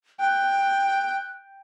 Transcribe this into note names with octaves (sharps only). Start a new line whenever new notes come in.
G5 F#6